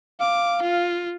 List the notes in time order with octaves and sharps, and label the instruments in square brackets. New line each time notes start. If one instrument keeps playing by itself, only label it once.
[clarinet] F5 [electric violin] D6
[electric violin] F4